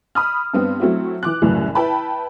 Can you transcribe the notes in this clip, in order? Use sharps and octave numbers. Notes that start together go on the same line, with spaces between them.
B5 D#6 F6
G2 B3 C4
F#3 A3 C4 E4 F#4
E3 D6 F#6
C2 F#2 A2 C#3 E3
E4 B4 G5 A5 B5